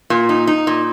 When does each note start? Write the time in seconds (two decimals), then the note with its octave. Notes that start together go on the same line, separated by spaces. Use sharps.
0.10 A#2
0.29 D#4
0.47 D#4
0.67 A#2